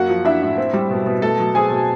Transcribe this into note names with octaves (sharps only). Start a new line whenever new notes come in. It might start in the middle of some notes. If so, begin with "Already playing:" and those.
Already playing: F#2 A#3 F#4 F#5
F3
D4 E4 E5
A2
C4
G3
B2
B2
A3 A4 A5
F#3
C4 G#4 G#5
B2